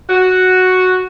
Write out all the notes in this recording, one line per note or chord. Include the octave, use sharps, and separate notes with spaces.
F#4